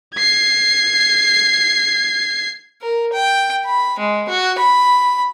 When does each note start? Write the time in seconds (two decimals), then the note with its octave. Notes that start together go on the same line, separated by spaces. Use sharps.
0.15 G#6 C7
2.81 A#4
3.13 G5
3.65 B5
3.99 G#3
4.29 F#4
4.58 B5